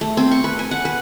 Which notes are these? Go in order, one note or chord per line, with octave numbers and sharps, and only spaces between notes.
A3
C4
C#6
B4
G#5
F#5
B4